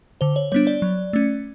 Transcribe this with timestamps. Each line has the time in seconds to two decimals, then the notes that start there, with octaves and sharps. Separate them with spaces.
0.21 D3 C5
0.36 C#5
0.52 G3 B3 D4 C#5
0.67 D5
0.82 F#3
1.13 A3 C#4